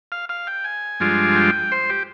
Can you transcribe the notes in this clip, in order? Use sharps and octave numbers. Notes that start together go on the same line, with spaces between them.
F5
F5
G5
G#5
G2 F3 G#3 D4 F4
G5
C5
G4